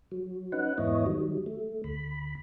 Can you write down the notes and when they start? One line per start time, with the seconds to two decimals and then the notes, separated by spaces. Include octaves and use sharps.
0.12 F#3
0.52 C#4 D#4 B4 F#5
0.78 E2 G#2 B3 E4 C#5 D#5
1.06 D#3 F#3 G3
1.46 A3
1.84 D2 B5